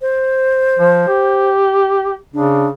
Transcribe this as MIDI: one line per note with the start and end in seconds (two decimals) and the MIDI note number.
0.01 1.50 72
0.78 1.07 53
1.08 2.15 67
2.34 2.70 49
2.34 2.68 62